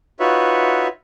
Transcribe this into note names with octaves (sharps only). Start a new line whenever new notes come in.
D#4 F4 F#4 B4 C#5 E5